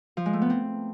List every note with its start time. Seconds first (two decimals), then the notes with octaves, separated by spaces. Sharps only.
0.17 F3
0.26 G#3
0.33 A3
0.42 B3
0.50 C4